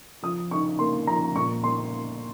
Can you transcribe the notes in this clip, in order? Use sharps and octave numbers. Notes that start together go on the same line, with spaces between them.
F3 D#6
D#4 C#6
A#3 C6
F3 A#5
A#2 C#6
A#3 C6